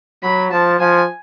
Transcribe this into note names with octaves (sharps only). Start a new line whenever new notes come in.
F#3 B5
F3 A5
F3 G#5